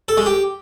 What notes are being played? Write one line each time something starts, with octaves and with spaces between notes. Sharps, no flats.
A4
G#3
G4